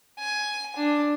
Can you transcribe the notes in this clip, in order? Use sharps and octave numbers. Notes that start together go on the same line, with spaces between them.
G#5
D4